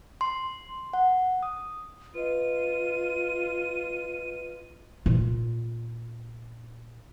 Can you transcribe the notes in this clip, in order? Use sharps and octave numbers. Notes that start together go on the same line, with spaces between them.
C6
F#5
D#6
F4 B4 D#5 D#7
A#2 F4